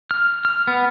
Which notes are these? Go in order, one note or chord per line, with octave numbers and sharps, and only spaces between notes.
F6
F6
B3